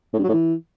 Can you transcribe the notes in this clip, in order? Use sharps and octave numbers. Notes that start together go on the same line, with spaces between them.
A2
G2
F#3
A2
E3